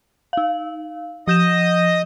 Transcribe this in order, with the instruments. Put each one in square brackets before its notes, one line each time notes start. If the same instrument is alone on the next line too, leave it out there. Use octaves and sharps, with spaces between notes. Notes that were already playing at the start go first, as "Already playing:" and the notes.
[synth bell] D#4 F5
[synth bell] F3 G6 E7 [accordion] D#5 D#6